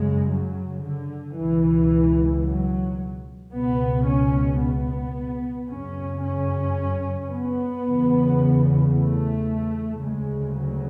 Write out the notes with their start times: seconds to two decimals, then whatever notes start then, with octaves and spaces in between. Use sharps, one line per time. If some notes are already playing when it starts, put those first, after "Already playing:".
Already playing: F#2 C#3 G#3
0.27 F#3
0.82 D3
1.36 C#2 B2 E3
2.44 F#3
3.52 C#2 B2 B3
4.06 C#4
4.60 B3
5.68 F#2 C#3 C#4
6.23 C#4
7.31 B3
7.85 E2 C#3
8.93 A3
10.01 D2 C#3 G#3
10.55 F#3